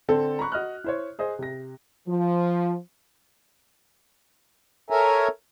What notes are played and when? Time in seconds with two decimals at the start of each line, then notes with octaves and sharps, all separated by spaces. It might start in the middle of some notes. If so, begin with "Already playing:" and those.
0.08 D3 C4 A4
0.39 A#5 B5 C#6 F#6
0.52 F#4 D#5 F6 F#6
0.84 E4 C5 C#5
1.19 G#4 C5 D#5
1.39 C3 A#6
2.07 F3
4.90 A4 A#4 C#5 E5 G#5 A#5